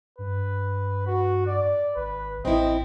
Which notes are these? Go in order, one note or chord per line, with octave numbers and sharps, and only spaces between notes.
G2 B4
F#4
D5
G#1 B4
A1 C4 E4 D#5